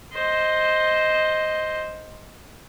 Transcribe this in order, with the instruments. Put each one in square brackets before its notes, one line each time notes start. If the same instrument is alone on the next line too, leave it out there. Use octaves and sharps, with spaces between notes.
[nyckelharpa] C5 D#5